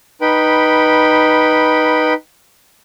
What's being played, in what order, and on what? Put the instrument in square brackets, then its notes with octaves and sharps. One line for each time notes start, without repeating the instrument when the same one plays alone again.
[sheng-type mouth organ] D#4 B4 G5 B5